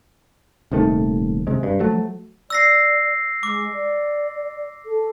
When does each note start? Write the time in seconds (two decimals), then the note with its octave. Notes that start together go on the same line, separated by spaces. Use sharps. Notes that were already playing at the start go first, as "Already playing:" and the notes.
0.72 D#1 C3 D#3 A3
1.47 C3 G#3
1.63 G2
1.80 F3 F#3 A3
2.50 D5 E6 A#6 C7
3.43 G#3 D6
3.74 D5
4.86 A4